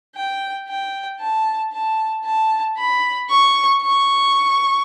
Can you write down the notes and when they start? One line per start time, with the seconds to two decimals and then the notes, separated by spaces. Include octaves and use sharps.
0.16 G5
0.68 G5
1.20 A5
1.72 A5
2.25 A5
2.77 B5
3.30 C#6
3.82 C#6